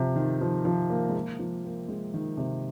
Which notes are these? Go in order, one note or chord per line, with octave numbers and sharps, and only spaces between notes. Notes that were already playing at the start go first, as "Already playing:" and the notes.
Already playing: C3 F3
D#3
F3
F3
A#3
G#3
A#3
F3
A#3
G#3
D#3
C3